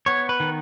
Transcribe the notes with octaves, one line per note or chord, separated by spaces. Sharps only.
B3 C#5
B4
D#3